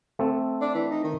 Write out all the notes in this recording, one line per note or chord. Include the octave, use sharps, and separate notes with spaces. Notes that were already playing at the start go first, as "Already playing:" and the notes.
A3 C4 A4
D4
E3
D#4
D#3